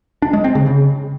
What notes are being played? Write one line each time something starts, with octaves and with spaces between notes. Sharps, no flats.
D4
G#3
C4
C#3
C#3